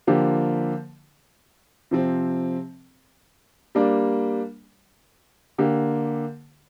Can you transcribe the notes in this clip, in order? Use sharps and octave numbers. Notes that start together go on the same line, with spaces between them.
D3 F3 A#3 G4
C3 F3 C4
G3 A#3 D4
D3 A#3 G4